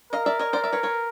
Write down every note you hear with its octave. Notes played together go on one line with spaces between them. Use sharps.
A#4 D#5 F5
D5 E5
C#5 D#5
C5 D5
D5 E5
B4 C#5
B4 C#5